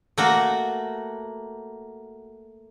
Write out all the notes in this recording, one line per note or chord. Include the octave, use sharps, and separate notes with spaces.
A3 A#3 F#4